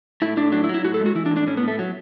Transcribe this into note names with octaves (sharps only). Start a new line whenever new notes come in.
A2 E4
A2 D4
F#3 D4
E4
F#3
E4
A2 F#4
A4
G#3
F#4
E3 E4
D4
A2
D4
A2 C#4
B3
A2 A3
F#3